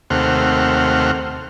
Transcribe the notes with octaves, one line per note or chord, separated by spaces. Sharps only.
D#2 C3 A3 C5 F#5 F6